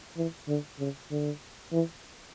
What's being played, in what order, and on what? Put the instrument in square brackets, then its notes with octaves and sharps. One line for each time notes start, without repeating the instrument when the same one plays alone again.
[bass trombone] E3
D3
C#3
D3
E3